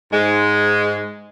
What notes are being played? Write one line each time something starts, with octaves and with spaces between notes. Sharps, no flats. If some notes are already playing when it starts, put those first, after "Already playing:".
G#2 G#3